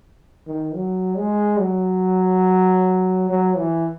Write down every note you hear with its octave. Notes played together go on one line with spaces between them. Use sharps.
D#3
F#3
G#3
F#3
F#3
E3